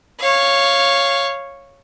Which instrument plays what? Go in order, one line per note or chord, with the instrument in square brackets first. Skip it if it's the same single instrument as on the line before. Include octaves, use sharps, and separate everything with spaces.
[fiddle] C#5 F5